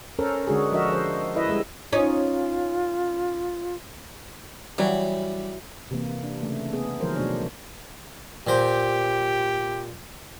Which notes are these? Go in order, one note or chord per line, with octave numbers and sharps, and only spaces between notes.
C#4 A4 A#4 C5
D3 G#3 D4 F#4 G#4
F3 D4 F#4 A#4 D#5 E5
F3 C5
E4 B4 D#5 E5
G3 G#3
C#4 D#4 F4
E3 F#3 G3
C3 E3 A#3
D4
C#3 A3
B3 G#4
D#3 F3 F#3 A#4 C5
B2 A3 D4 C#5
A#2 G4 C5